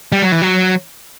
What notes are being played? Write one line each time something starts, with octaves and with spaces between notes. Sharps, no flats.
G3
F#3
E3
F#3